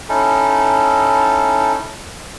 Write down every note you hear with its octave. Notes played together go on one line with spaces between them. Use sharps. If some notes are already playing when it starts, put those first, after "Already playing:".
C#4 D#4 E4 A4